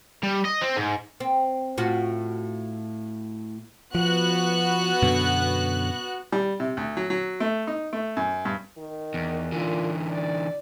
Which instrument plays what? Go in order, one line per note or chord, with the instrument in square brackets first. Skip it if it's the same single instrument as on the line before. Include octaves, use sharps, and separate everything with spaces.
[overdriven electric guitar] G3
D#5
C4
G#2
[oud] C4
A2 F4 F#4
[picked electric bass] F3 [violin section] B3 F#4 F#6
[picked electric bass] F#2 B2 D3
[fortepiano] G3
C3
D2
F#3
F#3
A3
D#4
A3
F#2
G2
[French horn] D#3
[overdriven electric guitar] E2
[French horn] A#2 [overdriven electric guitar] D3 E3
[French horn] D5